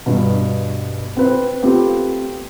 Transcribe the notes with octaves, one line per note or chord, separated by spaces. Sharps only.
G2 B2
C4 B4 C5
A3 B3 C4 F4 G4 B4